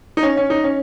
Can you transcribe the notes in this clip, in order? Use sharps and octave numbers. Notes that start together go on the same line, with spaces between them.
D#4
C#4
C#4
D#4
C#4